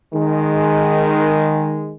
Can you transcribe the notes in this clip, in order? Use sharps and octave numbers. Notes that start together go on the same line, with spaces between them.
D#3 G#3